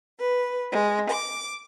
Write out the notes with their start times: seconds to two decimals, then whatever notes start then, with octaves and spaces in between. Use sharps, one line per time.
0.18 B4
0.70 G#3
1.09 D6